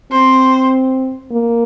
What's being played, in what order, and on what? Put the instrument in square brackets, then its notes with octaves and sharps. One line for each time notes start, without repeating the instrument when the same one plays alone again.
[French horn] C4 [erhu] C5
[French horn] A#3